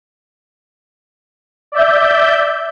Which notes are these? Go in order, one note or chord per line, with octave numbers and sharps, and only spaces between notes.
D5 E5 G6